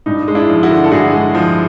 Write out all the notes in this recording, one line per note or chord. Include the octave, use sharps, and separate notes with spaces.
G2 D#4
G#3
D4 E4
F3
E4 F#4
D3
A4
G2 F#4 G#4
G#3
F3